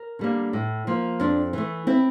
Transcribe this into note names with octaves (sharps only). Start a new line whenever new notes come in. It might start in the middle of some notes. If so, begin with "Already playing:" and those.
Already playing: A#4
D3 G3 A#3
A2
F3 A#3
F2 D4
E3 A3
C4 E4